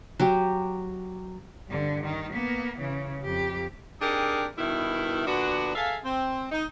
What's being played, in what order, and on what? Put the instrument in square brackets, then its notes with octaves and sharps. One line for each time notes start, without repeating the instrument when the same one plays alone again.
[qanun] F#3 G4
[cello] G2 D3
D#3
A#3 B3
C#3 E3
F2 G4
[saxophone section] C4 D4 D#4 G4 G#4 A#4
G2 B2 D#3 E4
A#2 D3 B3 D4 F#4
G#4 A4 E5 F5
C4
D#4